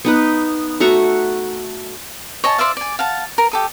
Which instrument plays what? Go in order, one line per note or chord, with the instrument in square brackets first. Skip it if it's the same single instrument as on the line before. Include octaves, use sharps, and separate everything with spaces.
[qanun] B3 D#4 B4
A3 F#4 A#5 C#6
[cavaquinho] C#5 D#5 G#5 A5
C5 D5 E5 F5
D5 G#5
F5 F#5 A5
A#4
G4 A4 D#6